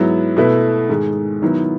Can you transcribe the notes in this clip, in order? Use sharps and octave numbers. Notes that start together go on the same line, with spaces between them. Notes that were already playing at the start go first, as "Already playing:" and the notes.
Already playing: G#2 F#3 B3 E4
B2 A3 E4 B4
G#2 D#3 G#3
D#3 F#3 B3 E4